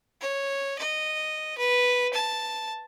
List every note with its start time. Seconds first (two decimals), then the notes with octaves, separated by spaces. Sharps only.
0.21 C#5
0.79 D#5
1.58 B4
2.13 A5